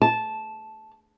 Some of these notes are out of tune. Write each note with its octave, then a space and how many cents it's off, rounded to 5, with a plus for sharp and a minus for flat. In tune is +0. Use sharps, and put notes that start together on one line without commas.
A5 -10